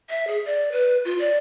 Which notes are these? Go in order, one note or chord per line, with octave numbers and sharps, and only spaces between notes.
E5
G#4
D5
B4
F4
D5